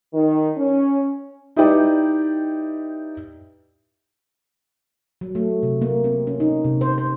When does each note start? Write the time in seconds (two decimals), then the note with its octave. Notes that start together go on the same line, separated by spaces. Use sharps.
0.13 D#3
0.57 C#4
1.56 D#4 E4 G4 B4 D5 G5
5.21 F#3
5.35 A3
5.63 C3
5.82 A#3
6.04 C4
6.27 C#4
6.40 D#4
6.64 C3
6.81 C5
6.98 C5